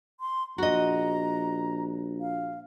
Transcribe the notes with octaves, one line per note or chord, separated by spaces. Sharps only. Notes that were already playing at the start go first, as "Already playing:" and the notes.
C6
A#1 F#4 D#5 A#5
F5